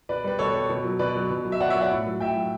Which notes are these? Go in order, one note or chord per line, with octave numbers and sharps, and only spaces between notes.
B2 B4 D5
G3 B4
B2 A4 C#5
G3
B2
F#3
B2 B4 D5
F#3
B2
F#3
E5
B2 D5 F#5
C#5 E5
F#3
D5 F#5
A2
F#3
A2 E5 G5
F#3